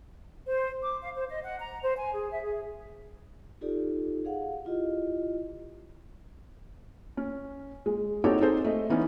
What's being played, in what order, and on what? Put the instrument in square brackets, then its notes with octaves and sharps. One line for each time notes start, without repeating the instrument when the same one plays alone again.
[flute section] C5
D6
F5
C5
D#5
F#5
A#5
C5
G#5
G#4
E5
G#4
[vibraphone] D#4 F4 G4 A4 D5
G#4 F5 F#5
E4 F4 G4 D#5
[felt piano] C#4
G#3
C4 D#4 F#4 G4 A4 C#5
C4 D#4 G#4 A4 C5
A3 D#5
E3 B3 C#4 D#4